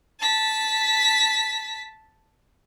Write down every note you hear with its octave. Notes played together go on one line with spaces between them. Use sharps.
A5 B6